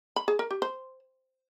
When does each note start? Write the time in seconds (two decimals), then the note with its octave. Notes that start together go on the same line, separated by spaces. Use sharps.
0.16 B5
0.28 G#4
0.39 A#4
0.51 G4
0.62 C5